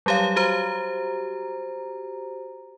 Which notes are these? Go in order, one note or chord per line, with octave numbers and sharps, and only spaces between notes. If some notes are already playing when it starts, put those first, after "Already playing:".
F#3 G3 G4 C#5 F5
F#4 G4 C5 A#5